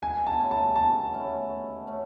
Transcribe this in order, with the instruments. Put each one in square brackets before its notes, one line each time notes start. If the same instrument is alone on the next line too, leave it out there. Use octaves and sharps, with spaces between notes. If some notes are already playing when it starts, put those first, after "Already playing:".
[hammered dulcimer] B2 [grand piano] G#5
[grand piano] A5
[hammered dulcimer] A3 C#4 E4
[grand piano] A5
[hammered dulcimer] B2 [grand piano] A5
[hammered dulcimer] A3 C#4 E4
B2
A3 C#4